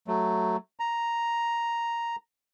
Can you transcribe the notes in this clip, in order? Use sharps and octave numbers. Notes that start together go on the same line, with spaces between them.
F#3 A3
A#5